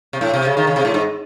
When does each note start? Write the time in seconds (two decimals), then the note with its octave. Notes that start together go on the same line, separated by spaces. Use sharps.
0.13 C3
0.21 A2
0.34 C3
0.45 C#3
0.57 D#3
0.67 C#3
0.76 C3
0.85 A2
0.94 G#2